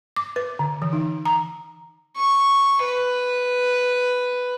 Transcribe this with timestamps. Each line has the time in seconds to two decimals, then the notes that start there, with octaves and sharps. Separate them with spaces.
0.16 D6
0.36 B4
0.59 D3
0.82 E3
0.93 D#4
1.25 A#5
2.17 C#6
2.84 B4